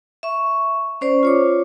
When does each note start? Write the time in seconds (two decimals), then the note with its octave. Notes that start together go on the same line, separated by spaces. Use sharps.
0.23 E5 C#6
1.01 C#4 C5 D5 C#6
1.23 F4 C#5 D6